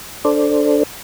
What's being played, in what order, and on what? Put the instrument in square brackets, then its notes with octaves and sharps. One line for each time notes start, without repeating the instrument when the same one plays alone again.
[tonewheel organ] D4 A4 C5 D5